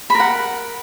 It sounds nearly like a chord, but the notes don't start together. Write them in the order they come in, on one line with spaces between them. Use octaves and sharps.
B5 A#4 F#5